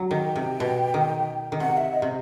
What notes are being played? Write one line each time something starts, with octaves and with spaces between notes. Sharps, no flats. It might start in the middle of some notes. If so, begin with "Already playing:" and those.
Already playing: F#3
D#3 G5
C3
B2
D#3
D#3
C3 F#5
E5
D#5
C3